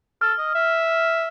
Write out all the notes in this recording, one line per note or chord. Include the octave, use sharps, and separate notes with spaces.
A4 F6
D#5
E5